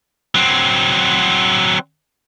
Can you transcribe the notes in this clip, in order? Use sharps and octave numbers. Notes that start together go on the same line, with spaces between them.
F#3 C4